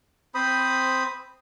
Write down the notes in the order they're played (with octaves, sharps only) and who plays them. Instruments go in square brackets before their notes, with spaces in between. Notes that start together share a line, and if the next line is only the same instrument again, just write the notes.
[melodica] C4 C5 B5 D#6